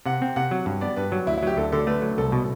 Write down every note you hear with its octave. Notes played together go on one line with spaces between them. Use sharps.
C3 F#5
C4
C3 F#5
F#3
G2
B3 D5
G2 B4
F#3
D2 E4
E4
F#3 G4
D2 A4
D3 A4
A3 B4
F#3
C2 A4
B2